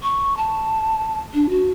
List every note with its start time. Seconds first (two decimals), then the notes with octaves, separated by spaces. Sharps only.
0.03 C#6
0.37 A5
1.34 D4
1.49 F#4